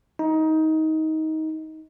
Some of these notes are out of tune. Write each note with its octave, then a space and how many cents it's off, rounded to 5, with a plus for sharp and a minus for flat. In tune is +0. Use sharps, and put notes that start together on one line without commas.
D#4 +20